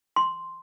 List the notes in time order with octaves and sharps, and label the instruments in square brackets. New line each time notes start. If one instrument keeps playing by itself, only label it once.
[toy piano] C6